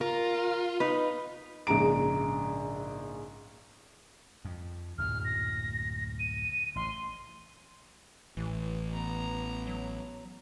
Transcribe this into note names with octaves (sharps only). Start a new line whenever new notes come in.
F4 A#4
D#4 B4
A#1 G#2 C#3 A#5 D7
F2
D1 F#2 A#2 F6
A#6
D#7
A1 C6
A1 E3
B3 A#5
F#3